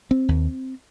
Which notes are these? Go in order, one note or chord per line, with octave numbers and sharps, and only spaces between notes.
C4
D#2